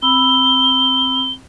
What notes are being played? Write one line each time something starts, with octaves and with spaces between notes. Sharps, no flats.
C4 B5 E6 G7